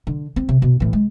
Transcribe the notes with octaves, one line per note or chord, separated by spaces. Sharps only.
D3
C4
C3
B2
A2 E3
G#3